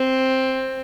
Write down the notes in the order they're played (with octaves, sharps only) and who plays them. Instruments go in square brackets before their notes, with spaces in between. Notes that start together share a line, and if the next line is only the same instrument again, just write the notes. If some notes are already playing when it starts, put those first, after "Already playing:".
Already playing: [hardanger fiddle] C4